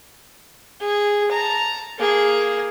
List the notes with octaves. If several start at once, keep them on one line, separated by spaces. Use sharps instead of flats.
G#4
A5 A#5
A#3 G#4